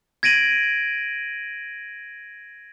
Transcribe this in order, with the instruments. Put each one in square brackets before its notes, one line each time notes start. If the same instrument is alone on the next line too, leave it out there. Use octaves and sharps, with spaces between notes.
[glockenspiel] G#6 A#6 D7 D#7 F#7